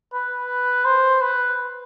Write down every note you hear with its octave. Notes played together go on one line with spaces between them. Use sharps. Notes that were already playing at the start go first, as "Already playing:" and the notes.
B4
C5
B4